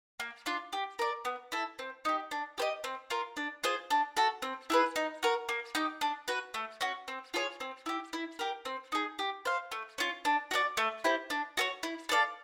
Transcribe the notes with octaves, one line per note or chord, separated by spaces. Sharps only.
A#3
D4 F4
G4
A#4 D5
B3
E4 A4
C4
D#4 G4
D4
G4 C5 D#5
C4
F4 A#4
D4
F4 G#4 C5
D4
F#4 A4
C4
E4 G#4 B4
D#4
F#4 A#4
A#3
D#4 G4
D4
F#4 B4
A3
C#4 F#4
C4
F4 G#4 C#5
C4
E4 G4
E4
G4 A#4
C4
D#4 G#4
G4
C5 F5
A3
C#4 F4
D4
F#4 A#4 D5
A3
C4 E4 G4
D4
F#4 A4 C#5
E4
A4 D5 F5